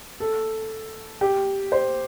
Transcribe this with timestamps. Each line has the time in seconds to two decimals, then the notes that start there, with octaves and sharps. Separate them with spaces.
0.20 A4
1.21 G4
1.72 C5